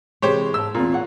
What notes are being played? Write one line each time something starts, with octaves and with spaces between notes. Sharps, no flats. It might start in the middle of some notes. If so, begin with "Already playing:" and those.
C3 E3 G#3 G4 C5 C#5
G#2 A5 E6
E2 A#2 C4 F4
C#5 F#5